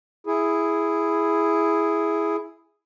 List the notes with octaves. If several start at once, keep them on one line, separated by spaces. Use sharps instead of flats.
E4 G#4